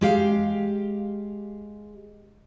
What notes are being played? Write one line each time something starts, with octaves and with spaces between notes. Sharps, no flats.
G#3 G4 F5